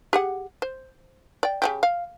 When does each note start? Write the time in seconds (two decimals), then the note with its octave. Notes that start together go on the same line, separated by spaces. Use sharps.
0.13 G4 G#4 F#5
0.62 C5
1.43 D5 G5
1.62 C#3 F#3 G4
1.83 F5